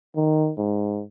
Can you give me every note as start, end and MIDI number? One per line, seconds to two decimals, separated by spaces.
0.16 0.52 51
0.58 1.02 44